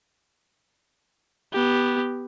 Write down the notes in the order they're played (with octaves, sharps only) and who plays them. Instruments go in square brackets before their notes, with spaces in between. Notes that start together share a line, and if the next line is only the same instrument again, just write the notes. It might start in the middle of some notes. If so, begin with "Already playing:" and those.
[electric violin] B3 G4